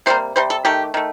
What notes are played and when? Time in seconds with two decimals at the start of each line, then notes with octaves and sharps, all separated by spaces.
0.06 C3 G3 A#3 C5
0.36 C3 G3 C5
0.50 A4
0.65 D#3 A3 G4
0.94 D#3 A3